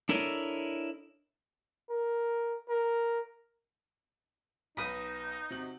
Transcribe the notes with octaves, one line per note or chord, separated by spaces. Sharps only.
D4 E4 A4 A#4 C#5 D#5
A#4
A#4
B1 D#4 B4 B5 D#6
C3 F#4 F#7